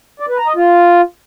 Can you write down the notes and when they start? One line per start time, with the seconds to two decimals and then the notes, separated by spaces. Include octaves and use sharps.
0.20 D5
0.29 B4
0.38 A#5
0.47 D#5
0.56 F4